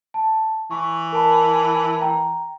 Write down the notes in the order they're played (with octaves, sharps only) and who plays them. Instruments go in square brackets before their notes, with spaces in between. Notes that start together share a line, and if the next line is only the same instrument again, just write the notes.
[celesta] A5
[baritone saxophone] E3 [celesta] C#6
[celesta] A#4 A5 B5
G5 A#5